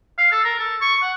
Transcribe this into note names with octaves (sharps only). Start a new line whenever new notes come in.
F5
A4
A#4
A4
C#6
F#5